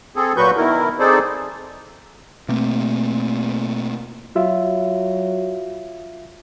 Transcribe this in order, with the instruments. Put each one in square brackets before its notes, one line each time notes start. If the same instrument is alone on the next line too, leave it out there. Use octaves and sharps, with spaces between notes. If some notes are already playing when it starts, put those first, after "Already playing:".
[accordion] C4 G#4 A4
A#2 F#3 F#4 B4 C#6 G6
B2 D#3 E4 A#4
C4 D#4 G#4 A4 C5 D5
[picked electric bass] B2 A3 A#3 C4
[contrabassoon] F#3 [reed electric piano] F4 E5